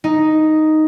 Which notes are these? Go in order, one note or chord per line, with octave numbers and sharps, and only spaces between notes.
D#4